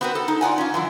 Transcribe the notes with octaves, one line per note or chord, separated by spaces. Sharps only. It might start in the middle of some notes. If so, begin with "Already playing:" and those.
B3 C4 F#4 A#4 B4
A4
D#4
F4 D5 F#5 G#5
C#4 F4
F#2 D3 E3